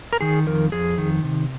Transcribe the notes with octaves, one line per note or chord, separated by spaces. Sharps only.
A#4
D#3 G#4
F2 A#4
F2 G#4
D#3
C3